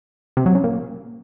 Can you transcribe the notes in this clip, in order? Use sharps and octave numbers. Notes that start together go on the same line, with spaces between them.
C3
F#3
C#3
A#2